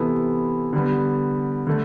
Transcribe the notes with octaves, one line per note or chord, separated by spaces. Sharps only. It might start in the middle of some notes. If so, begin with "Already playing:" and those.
Already playing: C3 E3 B3 E4 A4
D3 G3 B3
D3 A3